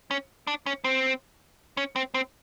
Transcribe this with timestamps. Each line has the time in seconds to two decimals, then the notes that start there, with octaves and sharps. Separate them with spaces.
0.11 C#4
0.47 D4
0.66 C#4
0.84 C4
1.77 C#4
1.96 C4
2.14 C4